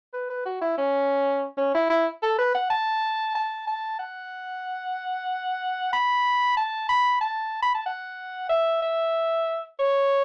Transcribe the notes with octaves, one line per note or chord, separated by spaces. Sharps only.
B4
B4
F#4
E4
C#4
C#4
E4
E4
A4
B4
F#5
A5
A5
A5
F#5
B5
A5
B5
A5
B5
A5
F#5
E5
E5
C#5